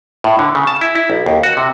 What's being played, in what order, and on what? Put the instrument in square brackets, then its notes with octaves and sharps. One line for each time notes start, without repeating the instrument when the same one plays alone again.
[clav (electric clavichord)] A2
D3
C#3
A5
E4
E4
B1
D#2
F#4
C3